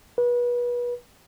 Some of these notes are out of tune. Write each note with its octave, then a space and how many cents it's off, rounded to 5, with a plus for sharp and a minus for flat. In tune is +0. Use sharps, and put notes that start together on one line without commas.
B4 -30